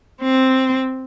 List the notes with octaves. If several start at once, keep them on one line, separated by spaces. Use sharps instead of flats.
C4